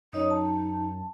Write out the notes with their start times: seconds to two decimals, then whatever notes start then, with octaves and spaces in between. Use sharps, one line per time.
0.13 F#2 D#4 C#5 D#5 D#6
0.30 A5